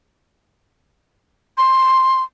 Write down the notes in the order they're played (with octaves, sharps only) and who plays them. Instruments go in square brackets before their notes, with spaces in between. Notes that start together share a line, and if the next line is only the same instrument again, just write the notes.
[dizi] C6